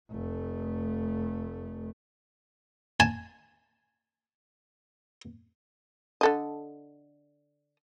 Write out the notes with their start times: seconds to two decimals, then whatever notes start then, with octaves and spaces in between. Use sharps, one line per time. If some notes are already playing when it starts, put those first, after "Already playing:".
0.11 F1 A3
3.00 G#5 A5
6.21 D3 A4 D#5